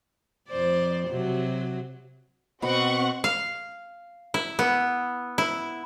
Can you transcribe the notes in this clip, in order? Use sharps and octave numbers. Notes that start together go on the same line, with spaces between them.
F2 C5 D5
C3 F#3 F#4
B2 C4 B4 F#5 C#6
F5
E4
B3
E4